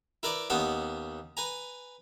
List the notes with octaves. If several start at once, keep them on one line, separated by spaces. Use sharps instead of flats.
E4 A#4 B4 D5
D#2 B3 C#4 F#5 A5 B5
B4 G#5 A#5